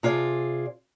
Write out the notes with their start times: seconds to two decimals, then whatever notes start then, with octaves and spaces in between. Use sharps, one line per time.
0.03 C3 F4 G#4 D5